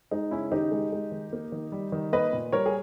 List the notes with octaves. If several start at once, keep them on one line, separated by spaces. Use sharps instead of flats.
G#3 D#4
C#3 C#4 E4
D#3 D#4 G4
G#3
G#3
D#3
A#3
D#3
G3
D#3
A#3 B4 D#5
A#2
G3 A#4 C#5
G#4